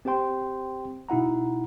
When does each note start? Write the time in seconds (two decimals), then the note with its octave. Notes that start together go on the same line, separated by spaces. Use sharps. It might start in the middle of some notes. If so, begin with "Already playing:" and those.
0.05 C4 G4 C5 G5 C6
1.09 B2 D#4 E4 F#5 A#5